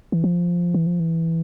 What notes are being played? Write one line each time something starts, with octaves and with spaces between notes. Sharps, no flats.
E3
F3
E3
F3
E3